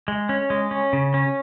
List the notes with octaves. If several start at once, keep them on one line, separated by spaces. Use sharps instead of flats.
G#3
C#4
G#3
C#4
C#3
C#4